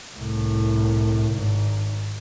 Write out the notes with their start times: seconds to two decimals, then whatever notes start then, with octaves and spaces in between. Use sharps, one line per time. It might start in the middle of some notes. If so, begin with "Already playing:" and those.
0.16 C2 A2
1.33 G#1 G#2